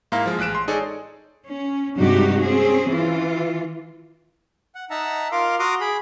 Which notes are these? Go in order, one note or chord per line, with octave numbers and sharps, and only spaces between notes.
G#2 A#3 E4 F5 A#5 F6
F3 G#3
A1 G#3 F#6 D7 E7
C6
D#4 G#4 A4 C#5 D5
C#4
G2 C3 G#3 D#4 F#4 G4
C4 C#4 G#4
E3 F4
F#5
D#4 E5 F#5 A5 A#5
F4 A#4 F5 C6 D6
F#4 A#5 C6 D6 D#6
G#4 B5